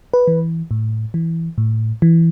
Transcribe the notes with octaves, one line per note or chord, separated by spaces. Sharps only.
B4
E3
A2
E3
A2
E3